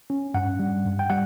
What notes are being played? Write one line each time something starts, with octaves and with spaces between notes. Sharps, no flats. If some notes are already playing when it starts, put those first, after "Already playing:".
C#4
G2 F#5
G3
G2
G5
G3 F#5